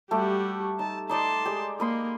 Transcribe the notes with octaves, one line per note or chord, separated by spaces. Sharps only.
G3 A3 F#4 G4
D#4 A5
D#4 D5 D#5 A5 C6
G#3 G4
A#3 D#5 B5 C6